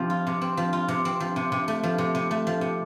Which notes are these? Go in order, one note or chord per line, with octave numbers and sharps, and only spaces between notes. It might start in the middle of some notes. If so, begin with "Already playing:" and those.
Already playing: C3 F3 C4
F4
C3
C4
F3
F4
C3
C4
F3
C3
C3
A3
F3
C3
C3
A3
F3
C3